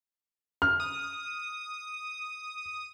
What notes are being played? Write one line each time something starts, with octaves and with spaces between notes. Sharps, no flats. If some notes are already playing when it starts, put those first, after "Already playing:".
F6
D#6